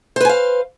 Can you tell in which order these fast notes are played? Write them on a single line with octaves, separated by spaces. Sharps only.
C5 B4 G#5 F5